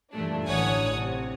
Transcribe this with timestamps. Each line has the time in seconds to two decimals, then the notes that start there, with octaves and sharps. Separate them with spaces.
0.13 G2 A#2 E3 A3 D4
0.48 A1 D3 C#5 F#5 G#5 D#6
0.93 C3